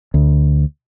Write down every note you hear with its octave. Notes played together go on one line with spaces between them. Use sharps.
D2